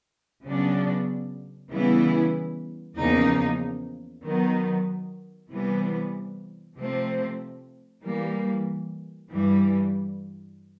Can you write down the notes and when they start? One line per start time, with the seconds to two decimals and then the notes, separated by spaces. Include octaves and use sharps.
0.44 C#3 F#3 B3 D4
1.71 C#3 E3 G3 B3 E4
2.97 E2 C#3 F3 A#3 D#4
4.24 D#3 F#3 B3
5.51 C3 E3 G3 B3
6.77 C3 F3 A3 C4
8.04 E3 G3 A#3
9.30 G2 E3 G3